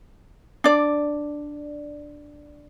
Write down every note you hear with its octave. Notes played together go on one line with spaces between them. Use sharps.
D4 D5